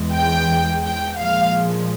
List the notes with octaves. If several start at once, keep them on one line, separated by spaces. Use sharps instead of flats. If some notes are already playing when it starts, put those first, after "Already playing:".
Already playing: E2 E3 G#3
G5
G5
A#2 F3 G#3 F5